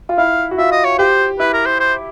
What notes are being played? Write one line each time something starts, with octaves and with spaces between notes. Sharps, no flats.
F4
E4 F5
F#4
F4 E5
D#5
C#5
G4 C5
E4 B4
A#4
C5
C5